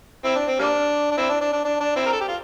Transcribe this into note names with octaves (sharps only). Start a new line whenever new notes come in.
C4 E4
D4
C4
G3 A#3 D4
D4
C4 E4
D4
D4
D4
D4
D4
C4 E4
A#4
A4
G4
F4